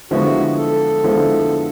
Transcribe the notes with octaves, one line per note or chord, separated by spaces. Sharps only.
D3 F3 G#3 B3 E4 F#4
A4
D3 F3 G#3 B3 E4